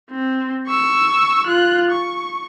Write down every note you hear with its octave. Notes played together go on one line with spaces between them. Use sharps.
C4
C#6 E6
F4 F#6
C#6